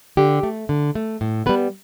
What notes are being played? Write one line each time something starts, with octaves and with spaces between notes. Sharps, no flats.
D3 G4
A3
D3
A3
A2
G3 B3 B4